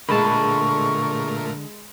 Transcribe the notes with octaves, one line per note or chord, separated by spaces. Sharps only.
A#2 D3 G#3 A3 A#4 A5 B5 C#6